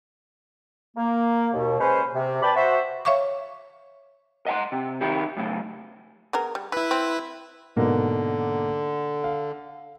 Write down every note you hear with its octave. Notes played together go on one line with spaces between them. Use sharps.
A#3
D#2 B2
G#3 C#4 B4 C5
C3
B4 D5 G5 A5 B5
F#4 C5 E5
C#5 E5 F5 C#6 D6
D#5 F#5 A5 C6
C3
D#3 D#4 E4 G4
F#2 A2 C#3
B3 G#4 A#4
G3
E3 E4 B4
C4
G#2 B2 D3 A#3
F5